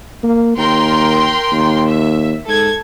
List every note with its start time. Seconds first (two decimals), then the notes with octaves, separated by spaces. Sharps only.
0.23 A#3
0.57 D#2 A#4 G5 C6
1.52 D#2
1.87 E5
2.48 G#2 A4 G#6